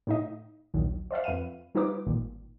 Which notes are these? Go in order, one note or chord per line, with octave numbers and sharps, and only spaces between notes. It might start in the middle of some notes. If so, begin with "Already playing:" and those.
A2 D#4 D#5
A#1 D#2 A#2 D#3 F#3
C5 D5 E5 F5
F2 B4 F5 D#7
G3 D#4 F4 B4 D6
G#1 A#2 D#3